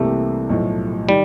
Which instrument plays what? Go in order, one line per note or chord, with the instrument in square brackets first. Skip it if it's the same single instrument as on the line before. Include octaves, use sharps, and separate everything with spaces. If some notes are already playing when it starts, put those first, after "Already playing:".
Already playing: [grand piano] C2 C3 E3 G3 A#3 [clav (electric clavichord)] A3
[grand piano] B1 A2 F3
[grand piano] D#3 [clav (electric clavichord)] G3